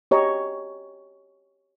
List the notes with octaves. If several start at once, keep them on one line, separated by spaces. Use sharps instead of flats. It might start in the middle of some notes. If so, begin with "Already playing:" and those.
G4 C#5 D#5 A#5